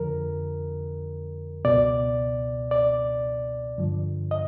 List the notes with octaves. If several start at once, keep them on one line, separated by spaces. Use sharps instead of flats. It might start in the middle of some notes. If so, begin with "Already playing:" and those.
Already playing: F2 D3 F3 A#4
C#2 B2 D5
D5
G2 D3 F3
D#5